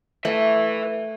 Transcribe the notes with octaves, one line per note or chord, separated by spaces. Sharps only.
A3 B4 E5